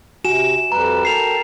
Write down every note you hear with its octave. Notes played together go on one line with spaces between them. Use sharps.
C3 F#4 G#5 E7
F2 G3 B4 A#5
A4 A#4 G5 C7 F7